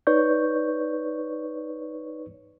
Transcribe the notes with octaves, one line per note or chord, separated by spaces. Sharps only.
D#4 B4 C#5 D5 C#6 G6